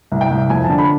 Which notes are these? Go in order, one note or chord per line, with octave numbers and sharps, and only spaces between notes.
C2
G5
C2
F2 G#5
D3 A5
B5